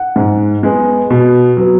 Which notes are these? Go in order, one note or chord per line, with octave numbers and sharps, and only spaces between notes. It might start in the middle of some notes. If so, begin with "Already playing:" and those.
Already playing: F#5
G#2
G#3 B3
B2
F#3 B3